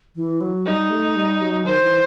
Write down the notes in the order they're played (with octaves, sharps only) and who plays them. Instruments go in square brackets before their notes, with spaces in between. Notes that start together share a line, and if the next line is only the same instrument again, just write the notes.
[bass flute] E3
F#3
[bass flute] G3 [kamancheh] D#4
[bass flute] A3
G3
F#3
[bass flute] D#3 [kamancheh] C5
[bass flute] E3